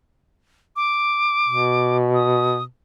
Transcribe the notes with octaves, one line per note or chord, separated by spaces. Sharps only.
D6
B2
D#6